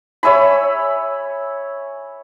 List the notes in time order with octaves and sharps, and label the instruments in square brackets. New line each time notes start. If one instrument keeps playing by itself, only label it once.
[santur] C#5 E5 G#5 B5